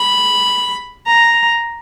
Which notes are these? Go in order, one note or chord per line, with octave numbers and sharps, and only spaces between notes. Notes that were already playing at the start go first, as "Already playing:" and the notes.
Already playing: B5
A#5